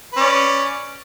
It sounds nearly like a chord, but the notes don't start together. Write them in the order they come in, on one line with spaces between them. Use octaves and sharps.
B4 C#4 D5